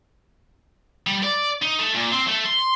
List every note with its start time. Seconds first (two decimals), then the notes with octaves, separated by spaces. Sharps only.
1.07 G3
1.23 D5
1.62 D#4
1.79 A3
1.95 A#2
2.12 C4
2.28 A3
2.46 C6